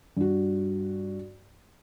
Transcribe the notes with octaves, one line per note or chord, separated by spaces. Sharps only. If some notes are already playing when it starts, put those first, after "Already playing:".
G2 F#4